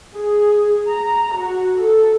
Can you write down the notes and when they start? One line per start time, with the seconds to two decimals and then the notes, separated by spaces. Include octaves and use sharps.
0.16 G#4
0.88 A#5
1.35 F#4
1.79 A4